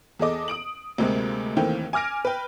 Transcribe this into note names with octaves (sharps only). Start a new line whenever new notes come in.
E2 G#4 A4 D#5 D6
D#6 D7 F#7
D2 C3 G#3 A#3 C4
D#2 D#3 E3 A3 C4 G5
G#5 D6 F6 A#6 D7
B4 G5